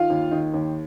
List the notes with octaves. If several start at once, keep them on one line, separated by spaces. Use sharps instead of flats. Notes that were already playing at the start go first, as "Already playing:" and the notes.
Already playing: D#3 F4 F5
D#2
D#3
D#2